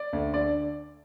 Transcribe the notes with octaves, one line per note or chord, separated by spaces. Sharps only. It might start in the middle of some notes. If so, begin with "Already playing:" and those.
Already playing: D5
D2
D3 D5